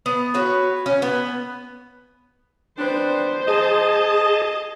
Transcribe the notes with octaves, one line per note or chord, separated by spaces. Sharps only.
B3
F#4 B4 C#5
C#4
B3
B3 C4 D4 C5
G#4 D#5 A5